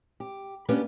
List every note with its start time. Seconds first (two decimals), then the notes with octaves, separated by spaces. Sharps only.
0.20 G4
0.69 A#3 B3 C#4 D4 G4 B4